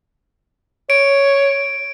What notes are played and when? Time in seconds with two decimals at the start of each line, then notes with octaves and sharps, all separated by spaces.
0.90 C#5 D7